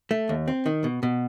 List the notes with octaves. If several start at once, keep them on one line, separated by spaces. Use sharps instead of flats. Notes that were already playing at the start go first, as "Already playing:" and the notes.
A3
D#2
C4
D#3
B2
B2